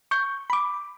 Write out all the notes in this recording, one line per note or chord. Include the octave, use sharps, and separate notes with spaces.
C#6 G6
B5 D6